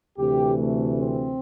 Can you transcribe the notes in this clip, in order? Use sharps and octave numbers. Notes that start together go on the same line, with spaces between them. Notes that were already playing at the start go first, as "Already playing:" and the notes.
D2 C3 E3 G4
A3
C4